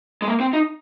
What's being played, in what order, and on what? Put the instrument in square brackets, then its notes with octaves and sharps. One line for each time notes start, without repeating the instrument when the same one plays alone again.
[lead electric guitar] G#3
A#3
C4
D#4